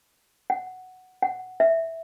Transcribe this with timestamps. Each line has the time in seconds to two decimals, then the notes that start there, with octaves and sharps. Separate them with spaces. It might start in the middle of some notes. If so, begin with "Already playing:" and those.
0.50 F#5
1.22 F#5
1.60 E5